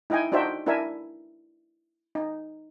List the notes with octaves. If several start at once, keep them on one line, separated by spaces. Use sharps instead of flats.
D#4 E4 D#5 G5 G#5
D4 D#4 F#4 C5 E5 G5
D4 E4 A#4 E5 G#5
D#4